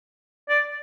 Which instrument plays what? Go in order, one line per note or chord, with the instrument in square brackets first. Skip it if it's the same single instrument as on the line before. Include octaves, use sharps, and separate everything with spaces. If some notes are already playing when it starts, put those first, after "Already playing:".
[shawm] D5